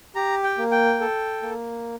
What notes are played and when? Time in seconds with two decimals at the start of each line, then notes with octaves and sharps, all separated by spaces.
0.15 G4 A#5
0.44 G5
0.58 A#3
0.71 G5
1.00 A4
1.42 A#3